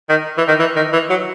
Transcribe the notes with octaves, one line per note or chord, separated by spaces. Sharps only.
D#3
E3
D#3
E3
D#3
E3
F#3